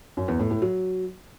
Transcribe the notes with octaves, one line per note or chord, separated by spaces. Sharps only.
F#2
E2
A2
A2
F#3